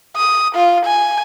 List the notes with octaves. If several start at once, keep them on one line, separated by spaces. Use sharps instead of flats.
D#6
F4
G#5